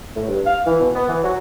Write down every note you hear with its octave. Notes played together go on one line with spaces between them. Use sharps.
A2
G2
F5
E3
B2
B3
E3
F#3